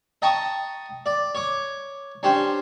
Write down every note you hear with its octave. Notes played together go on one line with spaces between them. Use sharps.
D#5 G5 A5 A#5 C#6 D#6
D5
C#5 D6
C#4 D4 G4 C5